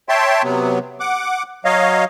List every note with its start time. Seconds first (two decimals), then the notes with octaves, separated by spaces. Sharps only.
0.09 C#5 E5 G5 A5 C6
0.43 C3 F#3 B3
1.00 F#5 D6
1.65 F#3 C#5 D#5 F5